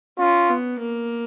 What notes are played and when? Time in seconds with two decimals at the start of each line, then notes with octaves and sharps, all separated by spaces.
0.19 C#4 F4
0.49 B3
0.79 A#3